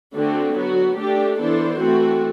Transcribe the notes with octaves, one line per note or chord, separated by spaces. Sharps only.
D3 A3 C4 F#4
F#3 B3 F#4
A3 D4 G4
E3 B3 D4 A4 C5
E3 A3 C4 F#4